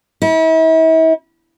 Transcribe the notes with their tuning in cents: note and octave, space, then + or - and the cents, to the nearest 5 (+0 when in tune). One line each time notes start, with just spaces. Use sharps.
E4 -40